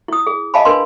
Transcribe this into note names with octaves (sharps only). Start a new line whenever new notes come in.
E4 D#6
G#4
D#5 F5 G#5 A5 B5
D4 A#4 B4 G#5 C6